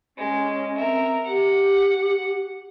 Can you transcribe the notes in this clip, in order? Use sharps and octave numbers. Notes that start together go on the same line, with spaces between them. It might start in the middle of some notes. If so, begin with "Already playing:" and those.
G#3 C#4
C4 A#4 E5
G4 F#5